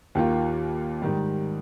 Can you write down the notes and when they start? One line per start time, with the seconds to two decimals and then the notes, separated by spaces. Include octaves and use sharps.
0.15 D#2 D#3 A#3 F4
1.02 G#2 D#3 G3